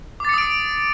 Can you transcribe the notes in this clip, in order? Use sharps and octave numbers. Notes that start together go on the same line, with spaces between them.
D6 D#6 A6 C#7 D7